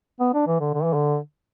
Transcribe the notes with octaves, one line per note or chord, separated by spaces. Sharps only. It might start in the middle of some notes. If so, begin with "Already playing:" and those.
B3
D4
E3
D3
D3
E3
D3